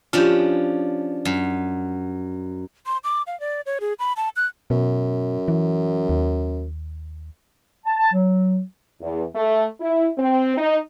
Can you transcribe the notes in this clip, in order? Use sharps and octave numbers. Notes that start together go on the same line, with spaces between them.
F3 C#4 D4 F4 G4
F#2
C6
D6
F5
D5
C#5
G#4
B5
A5
F#6
F#2 B2
E3
D#2
A5
A5
F#3
E2
A3
E4
C4
D#4